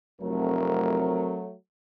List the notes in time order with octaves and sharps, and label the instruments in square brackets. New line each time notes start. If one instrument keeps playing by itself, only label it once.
[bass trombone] F1 [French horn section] F#3 A3 [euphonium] C4 [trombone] A#4